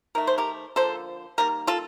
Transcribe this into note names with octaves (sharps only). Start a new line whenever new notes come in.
D#3 A3 A#4
C5
G4 A#4
D3 F3 A#3 A4 C5
D#3 G3 A#3 A#4
F4 A4